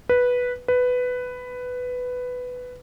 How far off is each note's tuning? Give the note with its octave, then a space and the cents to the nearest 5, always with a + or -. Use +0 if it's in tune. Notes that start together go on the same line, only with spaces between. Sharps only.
B4 -5
B4 +10